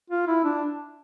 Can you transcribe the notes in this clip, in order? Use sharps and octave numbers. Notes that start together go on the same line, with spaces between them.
F4
E4
D4